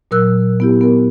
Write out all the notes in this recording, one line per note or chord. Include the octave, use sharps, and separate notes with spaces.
A#2 F#3 A#4 E6 F#6
B3 E4 G4
B3 A#4